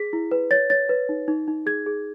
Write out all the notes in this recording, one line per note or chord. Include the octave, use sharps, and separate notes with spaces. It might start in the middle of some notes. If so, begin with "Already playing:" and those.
Already playing: G#4 B6
E4
B4
C#5 A6
C#5 A6
B4
D#4
D#4
D#4
G#4 G#6
G#4